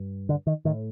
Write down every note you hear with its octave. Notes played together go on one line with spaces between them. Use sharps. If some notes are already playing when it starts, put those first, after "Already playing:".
Already playing: G2
D3
D#3
A2 D#3